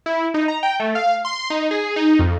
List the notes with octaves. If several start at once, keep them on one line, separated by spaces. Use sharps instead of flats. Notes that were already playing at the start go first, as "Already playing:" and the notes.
E4
D#4
A#5
G5
A3
F5
C6
D#4
G#4
D#4
F2